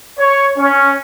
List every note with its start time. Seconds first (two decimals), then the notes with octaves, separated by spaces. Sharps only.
0.18 C#5
0.57 C#4